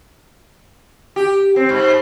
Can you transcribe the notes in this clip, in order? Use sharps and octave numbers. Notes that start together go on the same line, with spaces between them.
G4
C4
G#2